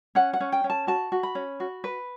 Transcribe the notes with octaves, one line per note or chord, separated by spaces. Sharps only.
C#4 F#5
F#5
C#4
G5
C#4
A5
F#4 A5
F#4
B5
C#4
F#4
B4